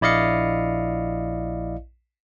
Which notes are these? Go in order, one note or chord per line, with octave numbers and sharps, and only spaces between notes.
A#1 E4 D5 D#5 F5 C#7